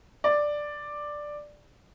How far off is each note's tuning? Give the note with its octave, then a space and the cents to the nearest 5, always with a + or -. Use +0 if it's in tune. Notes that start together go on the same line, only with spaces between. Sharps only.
D5 +5